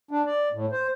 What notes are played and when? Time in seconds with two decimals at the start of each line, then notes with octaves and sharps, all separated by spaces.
0.11 D4
0.26 D5
0.53 A2
0.72 C5